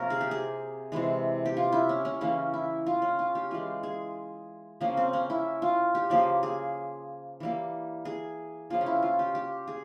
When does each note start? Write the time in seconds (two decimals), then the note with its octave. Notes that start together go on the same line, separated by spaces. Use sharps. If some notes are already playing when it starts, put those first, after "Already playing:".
Already playing: C3 F3 A#3 A#4 C#5
0.10 G#4
0.21 G4
0.31 G#4
0.92 C3 E3 G#3
1.46 G4
1.57 F4
1.72 E4
1.89 C#4
2.05 C#4
2.21 C#3 E3 A#3 C#4
2.54 E4
2.87 F4
3.02 C#4
3.19 F4
3.35 G4
3.51 E3 G#3 F4
3.83 G#4
4.81 C#3 F3 A#3 C#4
4.97 C4
5.13 C#4
5.30 E4
5.62 F4
5.95 G4
6.10 C#3 F3 A#3 G4
6.43 G#4
7.40 E3 G3 A#3
8.05 G#4
8.70 C#3 F3 A#3 F4
8.81 C#4
8.86 E4
9.02 F4
9.19 G4
9.35 G4
9.67 G#4